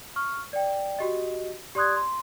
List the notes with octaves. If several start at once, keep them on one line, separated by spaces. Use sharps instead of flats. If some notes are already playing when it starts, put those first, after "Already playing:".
C#6 F6
D5 G5
F#4 G4 D#5
G4 D5 C6 D#6 F#6 G#6
C6